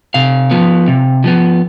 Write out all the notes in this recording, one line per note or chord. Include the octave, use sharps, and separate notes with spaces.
C3 F5
F3 B3
C3
F3 B3